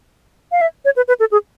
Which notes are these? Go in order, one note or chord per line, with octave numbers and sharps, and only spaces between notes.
F5
E5
C#5
B4
B4
A4
G#4